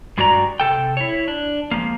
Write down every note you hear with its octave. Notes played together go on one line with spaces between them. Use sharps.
G2 G#3 F#4 G4 D5 A#5
C3 A4 G5
E4 C#5
D4
F3 G#3 A#3